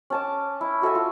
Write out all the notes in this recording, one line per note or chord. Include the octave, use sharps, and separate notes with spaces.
C#4 A5 D6
E4
F#4 A4 E5 G#5
F4